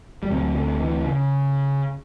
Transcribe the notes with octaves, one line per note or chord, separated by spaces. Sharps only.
G3
D2 C3 F#3
D3
E3
C#3